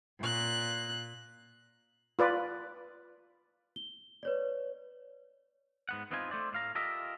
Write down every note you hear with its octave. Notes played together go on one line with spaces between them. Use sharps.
A#2 F#6
F4 B4 D5
G7
B4 C#5 D5
G#2 B3 F#5
E2 B3 C4 D#4 F4 G#5
A3 C5 D5
A2 F5 A#5
F4 G4 A4 A#4 D#5 E5